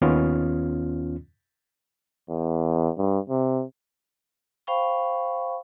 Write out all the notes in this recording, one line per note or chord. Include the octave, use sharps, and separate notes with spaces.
D#2 D#3 B3 C#4 F4 F6
E2
G2
C3
C5 F5 G5 B5 C#6